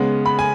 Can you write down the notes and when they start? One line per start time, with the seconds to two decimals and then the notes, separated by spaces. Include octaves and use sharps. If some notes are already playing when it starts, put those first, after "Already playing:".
Already playing: C#3 G#3 B3
0.26 B5
0.39 G#5